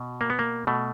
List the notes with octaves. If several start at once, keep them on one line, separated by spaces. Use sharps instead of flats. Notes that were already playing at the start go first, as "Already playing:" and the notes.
Already playing: B2
A#3
B3
A#3
B2 A3